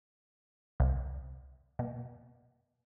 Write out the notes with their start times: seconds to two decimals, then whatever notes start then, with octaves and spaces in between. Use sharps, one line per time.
0.80 C2
1.79 B2